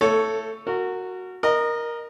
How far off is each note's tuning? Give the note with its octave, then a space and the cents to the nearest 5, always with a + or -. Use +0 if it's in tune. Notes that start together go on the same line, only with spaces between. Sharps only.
A3 +25 A4 +0 C#5 +5
F#4 -5 A#4 -25
A#4 +10 D#5 -20